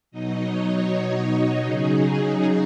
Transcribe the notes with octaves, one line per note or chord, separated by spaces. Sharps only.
B2 F#3 D#4 D#5
C#5
C#3 F#3 D#4 G#4
G#4